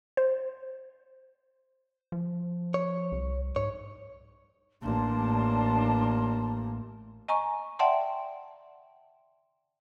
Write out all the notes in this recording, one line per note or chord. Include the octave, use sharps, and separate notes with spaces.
C5
F3
C#5
C2
G#2 C#5
A1 A#3 D4 A5 C6
D#5 G#5 A#5 C#6
D5 E5 F#5 G5 A5 C6